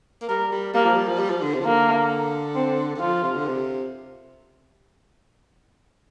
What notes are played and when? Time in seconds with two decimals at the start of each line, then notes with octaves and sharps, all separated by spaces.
0.21 A#3
0.29 G3 A#4
0.52 G3
0.74 G3 A#3
0.85 F3
0.97 G3
1.08 F3
1.19 G3
1.30 F3
1.42 D3
1.54 C3
1.60 F3
1.65 D3 A#3
2.55 C4
2.95 D3
3.00 F3 F4
3.23 C3
3.36 D3
3.48 C3